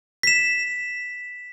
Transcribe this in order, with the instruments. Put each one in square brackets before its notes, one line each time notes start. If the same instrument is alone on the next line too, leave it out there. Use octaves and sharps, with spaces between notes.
[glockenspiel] B6 E7